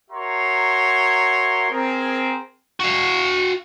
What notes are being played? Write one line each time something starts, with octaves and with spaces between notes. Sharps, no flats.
F#4 A#4 C#5 E5 A#5 C6
C4 G#4 A#4
F#4 F5